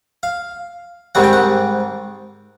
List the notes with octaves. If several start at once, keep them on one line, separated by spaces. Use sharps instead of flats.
F5
G#2 D#3 G3 C4 F#5
G5
F#5